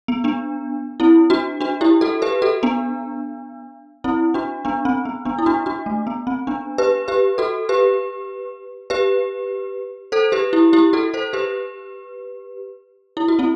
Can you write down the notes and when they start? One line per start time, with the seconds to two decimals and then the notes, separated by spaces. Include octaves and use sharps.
0.08 B3
0.24 B3 D4
1.00 C4 E4
1.30 D4 F#4
1.61 D4 F#4
1.81 E4 G4
2.01 F#4 A4
2.22 G4 B4
2.42 F#4 A4
2.63 B3 D4
4.04 C4 E4
4.34 D4 F#4
4.65 B3 D4
4.85 C4
5.05 B3
5.25 B3 D4
5.39 E4
5.46 D4 F#4
5.66 D4 F#4
5.86 A3
6.07 B3
6.27 C4
6.47 B3 D4
6.78 G4 B4
7.08 G4 B4
7.38 F#4 A4
7.69 G4 B4
8.90 G4 B4
10.12 A4 C5
10.32 G4 B4
10.53 E4 G4
10.73 E4 G4
10.93 F#4 A4
11.14 A4 C5
11.33 G4 B4
13.17 E4
13.28 F#4
13.39 C4 E4